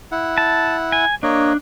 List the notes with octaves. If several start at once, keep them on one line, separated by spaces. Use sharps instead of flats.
E4 F#5
A5
G#5
A#3 D4 C#5 D#5